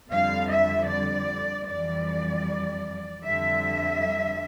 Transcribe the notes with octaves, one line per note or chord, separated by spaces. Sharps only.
F2 D3 G3 F5
E5
D5
F2 E3 G3 D5
F2 D3 G3 E5